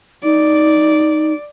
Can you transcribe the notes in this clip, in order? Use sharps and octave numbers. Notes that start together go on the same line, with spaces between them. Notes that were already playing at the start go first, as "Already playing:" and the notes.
D#4 D5